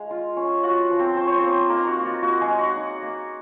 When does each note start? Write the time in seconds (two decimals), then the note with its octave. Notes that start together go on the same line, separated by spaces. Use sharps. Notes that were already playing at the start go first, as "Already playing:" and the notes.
Already playing: G#3 F5
0.11 F4
0.37 C#4
0.63 F4 F#4 F#5
0.90 F3
0.99 C4 C5
1.17 C#4 C5
1.27 C#5
1.37 C4 C5
1.43 A#3
1.70 A#3 D#4 A#4
1.87 F#4
1.97 A#3
2.06 F4
2.23 A#3 F#4
2.41 G#3 G#4
2.50 D#4
2.59 F#4
2.77 D#4
3.03 A#3